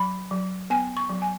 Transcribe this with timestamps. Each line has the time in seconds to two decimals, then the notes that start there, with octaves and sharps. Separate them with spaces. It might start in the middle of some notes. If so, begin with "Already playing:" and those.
Already playing: F#3 B5
0.31 F#3
0.70 B3 G#5
0.97 C#6
1.09 F#3
1.22 G#5